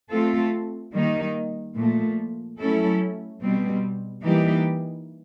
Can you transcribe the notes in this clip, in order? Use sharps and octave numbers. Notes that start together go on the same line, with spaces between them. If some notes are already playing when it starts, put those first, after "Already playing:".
A3 C4 F4 A4
D#3 G3 A#3 D#4
A#2 F3 A3
F#3 A3 C#4 E4 A4
B2 G3 C4
E3 G3 A#3 D#4 G4